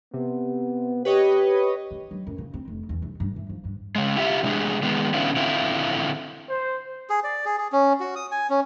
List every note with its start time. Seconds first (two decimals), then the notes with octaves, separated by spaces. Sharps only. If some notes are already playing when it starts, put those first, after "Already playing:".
0.14 C3 B3
1.05 G4 B4 C#5 D#5
1.91 D#4
2.11 F#3
2.27 F#2
2.38 C#3
2.54 C4
2.68 F1
2.89 E2
3.02 C2
3.20 G2
3.36 E3
3.49 F3
3.65 G2
3.96 C#3 G#3
4.16 E4 F4 G4 E5
4.43 C3 G#3 D4 G#4
4.83 D#3 G#3 B3
5.14 D3 B3 C#4 E4 F4
5.36 D3 C4 E4 F4
6.49 C5
7.10 G#4
7.24 D5
7.45 G#4
7.58 G#4
7.72 C#4
8.00 F#4
8.16 D#6
8.32 G#5
8.50 C#4